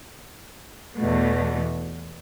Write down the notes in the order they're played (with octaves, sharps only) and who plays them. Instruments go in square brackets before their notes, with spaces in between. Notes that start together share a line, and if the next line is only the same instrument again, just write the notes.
[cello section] E2 B2 A3